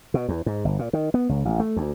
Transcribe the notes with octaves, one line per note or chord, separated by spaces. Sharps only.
B2
E2
G#2
G1
A#2
D#3
B3
C#2
A1
A3
D2